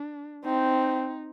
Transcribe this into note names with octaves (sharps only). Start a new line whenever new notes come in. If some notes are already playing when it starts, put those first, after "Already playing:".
Already playing: D4
C4 D#4